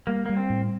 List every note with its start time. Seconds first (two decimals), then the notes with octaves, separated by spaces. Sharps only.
0.07 G3 A#3
0.26 G3 A#3
0.37 C4
0.50 A2